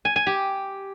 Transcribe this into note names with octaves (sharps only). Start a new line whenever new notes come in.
G#5
G#5
G4